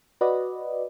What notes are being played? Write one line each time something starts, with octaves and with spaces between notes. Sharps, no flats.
F#4 B4 D5 D#5